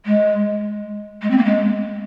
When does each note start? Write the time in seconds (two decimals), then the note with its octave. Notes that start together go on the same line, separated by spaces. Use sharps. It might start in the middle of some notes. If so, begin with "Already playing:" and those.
0.06 G#3
1.22 G#3
1.31 C4
1.38 A#3
1.45 G#3